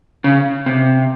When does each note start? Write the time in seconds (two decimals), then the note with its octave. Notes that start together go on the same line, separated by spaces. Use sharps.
0.24 C#3
0.66 C3